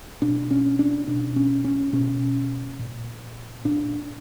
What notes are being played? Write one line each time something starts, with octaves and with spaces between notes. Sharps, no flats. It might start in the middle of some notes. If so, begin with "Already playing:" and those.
B2 D4
C#4
D4
B2 D4
C#4
C#4
B2 C#4
A#2
A#2 D4